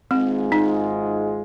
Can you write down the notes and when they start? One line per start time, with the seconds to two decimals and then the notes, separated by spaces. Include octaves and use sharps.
0.10 G#1 G#2 G#3 C4 F4
0.52 D#4